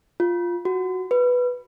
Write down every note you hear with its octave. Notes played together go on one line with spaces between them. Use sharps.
F4
F#4
B4